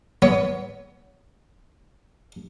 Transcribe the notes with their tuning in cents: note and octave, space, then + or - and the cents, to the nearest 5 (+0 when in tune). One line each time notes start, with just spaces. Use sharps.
B3 +0 C#5 +20